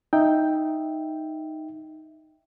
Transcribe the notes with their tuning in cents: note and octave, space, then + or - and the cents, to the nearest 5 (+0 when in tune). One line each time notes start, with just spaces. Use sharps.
D#4 +0 E5 +0 G5 +0